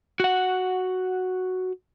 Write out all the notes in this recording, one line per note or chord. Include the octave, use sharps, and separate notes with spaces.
F#4 F#5